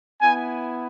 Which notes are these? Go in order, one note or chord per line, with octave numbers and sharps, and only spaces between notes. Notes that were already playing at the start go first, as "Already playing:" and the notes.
B3 E4 G#5